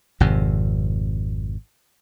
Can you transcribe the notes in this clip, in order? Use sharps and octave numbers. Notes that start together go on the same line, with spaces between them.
G#1 F2 C3